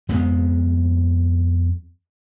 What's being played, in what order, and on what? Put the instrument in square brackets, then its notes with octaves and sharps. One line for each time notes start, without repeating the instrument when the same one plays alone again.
[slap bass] F2 G#3 B3 C4